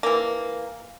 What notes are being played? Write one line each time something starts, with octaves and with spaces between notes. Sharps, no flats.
E3 A#3